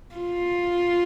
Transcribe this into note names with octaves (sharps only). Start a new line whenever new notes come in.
F4